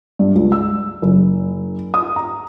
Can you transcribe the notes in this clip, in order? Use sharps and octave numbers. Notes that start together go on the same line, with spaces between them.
G2
C#2
E6
F#1
D#6
A#5